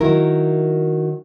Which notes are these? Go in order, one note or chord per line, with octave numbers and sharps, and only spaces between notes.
D#3 F#3 E4 A#4